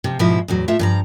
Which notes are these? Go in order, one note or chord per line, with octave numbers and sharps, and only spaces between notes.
C3 F3
G#2 B2 F3 A#3 E4
E2 A2 F#3
A2 A3 F4 E5
G2 F3 A#5